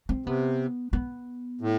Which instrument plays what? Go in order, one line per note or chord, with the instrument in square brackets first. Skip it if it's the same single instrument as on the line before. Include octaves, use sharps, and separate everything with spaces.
[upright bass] C4
[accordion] C3 [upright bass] B3
[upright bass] B3
[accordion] A2